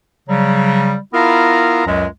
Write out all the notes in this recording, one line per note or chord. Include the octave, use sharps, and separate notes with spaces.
C#3 F#3 G3
B3 E4 F4 A#4 F5 A#5
C#2 F#2 F#3 G#3